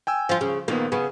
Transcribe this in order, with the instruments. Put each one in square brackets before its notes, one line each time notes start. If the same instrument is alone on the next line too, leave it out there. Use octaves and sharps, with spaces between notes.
[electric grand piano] G5 G#5 E6
[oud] F3 F4
C#3
[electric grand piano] A#2 D#3 B3 [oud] A#3
[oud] C#3 B3 [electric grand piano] G#4